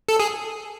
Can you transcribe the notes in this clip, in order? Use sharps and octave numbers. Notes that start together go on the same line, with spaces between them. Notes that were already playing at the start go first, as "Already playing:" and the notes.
A4
G#4